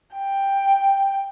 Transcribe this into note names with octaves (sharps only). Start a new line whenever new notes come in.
G5